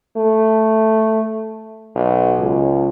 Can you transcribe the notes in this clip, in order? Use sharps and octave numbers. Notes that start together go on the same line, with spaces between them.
A3
B1
C#2